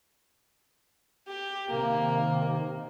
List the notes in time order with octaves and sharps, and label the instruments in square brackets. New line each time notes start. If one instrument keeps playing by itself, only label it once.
[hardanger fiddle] G4
[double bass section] C3 D#3 [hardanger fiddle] A#3